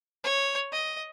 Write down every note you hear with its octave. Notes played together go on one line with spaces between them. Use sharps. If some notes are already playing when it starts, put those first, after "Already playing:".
C#5
D#5